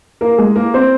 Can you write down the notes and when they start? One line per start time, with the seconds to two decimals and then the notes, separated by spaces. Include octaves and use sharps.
0.21 A#3 A#4
0.38 G#3 G#4
0.56 A#3 A#4
0.74 C4 C5